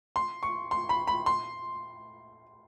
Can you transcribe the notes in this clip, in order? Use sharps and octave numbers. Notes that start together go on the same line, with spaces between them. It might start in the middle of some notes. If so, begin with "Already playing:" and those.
C6
C#6
C6
B5
B5
C6